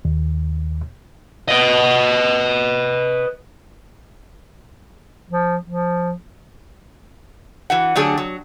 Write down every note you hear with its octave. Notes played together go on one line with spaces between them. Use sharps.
D#2
B4 D#5
F3
F3
E3 F#4 F#5
D3 F#3 A3 D4 G4 G#4
F#3